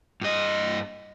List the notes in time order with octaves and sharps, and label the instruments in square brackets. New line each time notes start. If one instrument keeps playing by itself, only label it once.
[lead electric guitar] G2 D#5